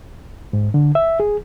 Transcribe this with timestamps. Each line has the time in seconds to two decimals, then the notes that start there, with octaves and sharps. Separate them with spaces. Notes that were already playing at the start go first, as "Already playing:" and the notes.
0.53 G#2
0.74 D3
0.95 E5
1.20 G#4